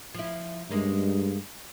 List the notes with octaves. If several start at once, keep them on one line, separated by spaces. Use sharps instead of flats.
F3 E4
G2 G#3 A#3 C#4